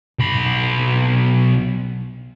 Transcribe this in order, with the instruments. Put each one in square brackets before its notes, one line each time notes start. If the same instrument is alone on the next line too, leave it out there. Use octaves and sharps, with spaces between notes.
[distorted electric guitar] B1 B5